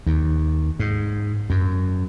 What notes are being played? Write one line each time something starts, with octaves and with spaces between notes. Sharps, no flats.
D#2
G#2
F#2